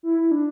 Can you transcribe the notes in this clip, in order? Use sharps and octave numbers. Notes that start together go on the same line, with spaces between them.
E4
D4